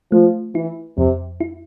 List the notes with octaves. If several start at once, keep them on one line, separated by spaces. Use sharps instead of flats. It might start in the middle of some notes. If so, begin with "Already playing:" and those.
F3 A3
E3 E4
F2 C3
E4